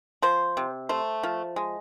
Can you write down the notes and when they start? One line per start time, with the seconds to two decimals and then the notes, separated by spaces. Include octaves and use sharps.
0.22 F3 C5
0.57 C3
0.89 A3 C5
1.23 F3
1.56 G#3